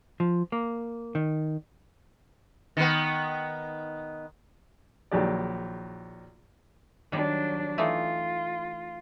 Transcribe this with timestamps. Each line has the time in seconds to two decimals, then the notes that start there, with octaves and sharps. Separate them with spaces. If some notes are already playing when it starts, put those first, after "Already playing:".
0.20 F3
0.52 A#3
1.15 D#3
2.77 D#3 B3
5.11 A#1 D#3 F#3 G4 G#4 D5
7.12 D#3 F#3 G3 D4
7.78 E3 A3 D#4 F4